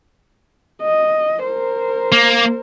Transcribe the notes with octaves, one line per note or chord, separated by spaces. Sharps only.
D#5
A#4 C5
A#3